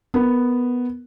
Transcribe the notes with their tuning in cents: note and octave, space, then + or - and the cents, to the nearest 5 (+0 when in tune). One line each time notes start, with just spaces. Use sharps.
B3 +0 A#4 +0